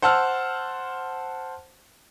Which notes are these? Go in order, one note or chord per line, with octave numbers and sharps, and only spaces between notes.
C5 F#5 A5 E6 F6